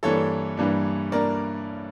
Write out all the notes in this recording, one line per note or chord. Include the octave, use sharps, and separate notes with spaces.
G2 E3 A#3 D4 A4 C#5
G2 E3 A#3 D4
A#3 D4 A#4 D5